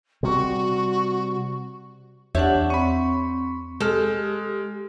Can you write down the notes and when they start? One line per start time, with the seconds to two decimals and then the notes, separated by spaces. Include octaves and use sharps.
0.23 C3 G3 F#4
2.35 E2 D4 G4 C#5 E5 F#5
2.70 C4 B5 C#6
3.81 G#3 G4 A4 F6